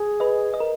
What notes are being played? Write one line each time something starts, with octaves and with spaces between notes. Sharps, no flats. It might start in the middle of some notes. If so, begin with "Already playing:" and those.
Already playing: G#4
B4 D#5
D#5
A#4